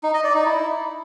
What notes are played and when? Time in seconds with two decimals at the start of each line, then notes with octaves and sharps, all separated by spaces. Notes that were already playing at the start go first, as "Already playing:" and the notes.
0.03 D#4
0.14 D#5
0.24 D5
0.35 D#4
0.45 E4